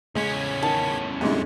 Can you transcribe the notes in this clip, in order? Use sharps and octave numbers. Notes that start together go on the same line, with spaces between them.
E2 C#3 G#3 C#4 G#6 B6
D#3 A5
F2 D3 G3 G#3 E4